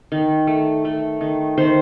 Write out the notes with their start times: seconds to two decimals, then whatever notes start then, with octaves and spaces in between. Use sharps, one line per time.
0.12 D#3
0.47 A3
0.85 A3
1.21 D#3
1.58 D#3 C5